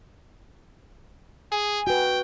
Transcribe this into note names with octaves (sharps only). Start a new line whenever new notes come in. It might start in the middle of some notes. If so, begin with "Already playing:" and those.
G#4 G#5
F#4 B4 G5